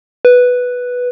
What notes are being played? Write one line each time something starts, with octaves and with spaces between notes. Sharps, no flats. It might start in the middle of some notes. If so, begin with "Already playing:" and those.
B4